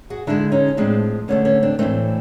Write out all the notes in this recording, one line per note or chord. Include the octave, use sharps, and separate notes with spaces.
F#4 G#4
D3 F3 G#3 D4 E4
C#4 D#4
A2 F3 G#3 C4 D4
D3 F#3 A3 B3 C#4
B3 C#4
C4 D4
A2 E3 A3 C4 D4